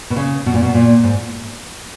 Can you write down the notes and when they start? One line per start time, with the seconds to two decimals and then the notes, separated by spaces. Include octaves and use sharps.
0.10 B2
0.16 C#3
0.46 B2
0.54 A#2
0.63 B2
0.74 A#2
1.03 G#2